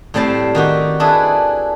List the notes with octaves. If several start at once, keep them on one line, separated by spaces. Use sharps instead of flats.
A2 G3 C4 C5 A5
D#3 F#4 G4
D4 E4 G#4 A4 B4